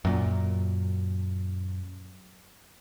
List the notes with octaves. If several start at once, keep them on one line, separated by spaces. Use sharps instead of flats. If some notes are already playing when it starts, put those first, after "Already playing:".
F#2 A#2